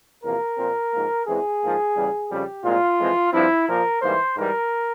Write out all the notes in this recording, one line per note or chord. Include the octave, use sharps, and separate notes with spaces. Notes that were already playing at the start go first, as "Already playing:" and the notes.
E2 C3 F3 A#3 A#4
A#2 F3 C4
G#2 F3 A#3
E2 E3 G#3 C4 G#4
G#2 F3 A#3
E2 C#3 G3
F2 C#3 G3 G4
C2 A#2 G#3 C4 F4
F2 E3 G#3 C4
G2 F3 C4 E4
A#2 F3 A#3 A#4
G#2 E3 G3 A#3 C5
G#2 E3 G3 A#4